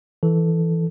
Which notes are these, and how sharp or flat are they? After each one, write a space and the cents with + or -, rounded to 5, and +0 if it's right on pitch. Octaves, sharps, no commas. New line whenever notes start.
E3 +0 A4 +0